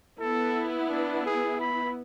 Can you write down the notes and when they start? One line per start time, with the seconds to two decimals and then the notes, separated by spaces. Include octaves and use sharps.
0.19 B3 E4 A4
0.88 D4
1.25 G#4
1.60 B5